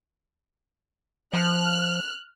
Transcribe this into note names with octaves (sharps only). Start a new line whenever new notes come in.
F3 F6 F#6